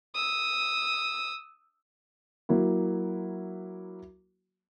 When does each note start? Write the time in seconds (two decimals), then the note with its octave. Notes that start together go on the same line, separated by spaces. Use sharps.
0.15 D#6 E6
2.49 F#3 A#3 E4 F#4